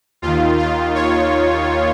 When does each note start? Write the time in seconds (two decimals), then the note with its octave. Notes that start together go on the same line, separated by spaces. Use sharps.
0.22 D#2 D#3 F4
0.58 F4
0.95 C#5